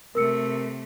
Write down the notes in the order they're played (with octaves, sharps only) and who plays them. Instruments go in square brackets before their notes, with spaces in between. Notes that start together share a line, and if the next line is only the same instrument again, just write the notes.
[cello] C3 A3 [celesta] A#4 E6 C#7